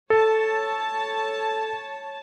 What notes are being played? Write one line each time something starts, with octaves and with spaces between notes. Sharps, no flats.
A4 C#5 A5